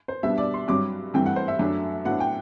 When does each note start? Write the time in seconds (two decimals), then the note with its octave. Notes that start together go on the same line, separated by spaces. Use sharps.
0.08 C5
0.23 B2 G3 B3 D4 E5
0.38 D5
0.54 C6
0.68 G2 F#3 C4 D6
1.14 G2 E3 A3 C4 G5
1.26 F#5
1.36 C5
1.48 E5
1.59 F#2 F#3 A3 D4
2.05 A2 F#3 B3 D4 F#5
2.20 G5